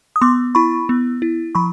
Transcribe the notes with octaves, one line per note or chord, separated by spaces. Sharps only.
D#6
B3 C6 D6
E4 B5 C#6
B3
E4
F3 B5 C#6